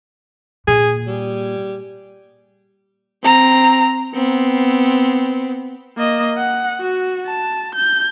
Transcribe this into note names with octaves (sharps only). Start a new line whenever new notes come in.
A#2 G#4
G3
C4 A#5
B3 C4
A#3 D#5
F#5
F#4
A5
G6